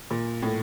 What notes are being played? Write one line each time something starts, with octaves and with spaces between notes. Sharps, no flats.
A#2
A2